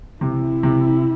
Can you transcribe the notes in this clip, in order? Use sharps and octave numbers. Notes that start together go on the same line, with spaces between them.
C3 E4
C3